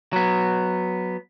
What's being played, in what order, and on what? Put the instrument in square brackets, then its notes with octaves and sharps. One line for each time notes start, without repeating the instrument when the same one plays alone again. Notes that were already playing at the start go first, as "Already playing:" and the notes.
[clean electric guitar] F#3 B3